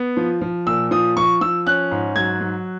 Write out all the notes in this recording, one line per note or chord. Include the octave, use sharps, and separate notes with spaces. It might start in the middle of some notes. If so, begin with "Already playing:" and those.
Already playing: B3
F3
F3
A#2 E6
F3 D#6
F3 C#6
F3 E6
C#4 F#6
G#2
F#3 G#6
F#3